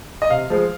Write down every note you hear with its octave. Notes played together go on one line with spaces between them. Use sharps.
D#5
C3 F5
F3 G#3